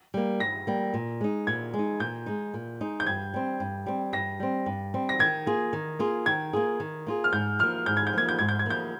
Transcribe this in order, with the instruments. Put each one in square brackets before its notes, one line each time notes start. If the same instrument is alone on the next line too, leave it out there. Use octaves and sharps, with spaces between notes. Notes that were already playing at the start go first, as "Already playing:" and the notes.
[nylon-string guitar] G3 A#3
[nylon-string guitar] G2 [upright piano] A#6
[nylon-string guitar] G3 A#3
A#2
G#3 D#4
[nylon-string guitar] A#2 [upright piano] G#6
[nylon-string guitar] G#3
D#4
[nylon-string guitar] A#2 [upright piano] G6
[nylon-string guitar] G#3 D#4
A#2
G#3 D#4
[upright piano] G6
[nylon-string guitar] G2 [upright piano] G#6
[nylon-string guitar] G3 C4
G2
G3 C4
[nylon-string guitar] G2 [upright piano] A#6
[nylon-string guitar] G3 C4
G2
G3 C4
[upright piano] A#6
[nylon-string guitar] D#3 [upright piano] G#6
[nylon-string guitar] A#3 F4 G#4
D#3
A#3 F4 G#4
[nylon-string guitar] D#3 [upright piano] G#6
[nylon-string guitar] A#3 F4 G#4
D#3
A#3 F4 G#4
[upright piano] F6
[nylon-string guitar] G#2 [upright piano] G6
[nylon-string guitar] F3 A#3 [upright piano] F6
[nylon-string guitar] G#2 [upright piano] G6
[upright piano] G#6
G6
[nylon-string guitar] F3 A#3 [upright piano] G#6
[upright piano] G6
[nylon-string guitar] G#2 [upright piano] G#6
[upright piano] G6
G#6
[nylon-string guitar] F3 A#3 [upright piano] G6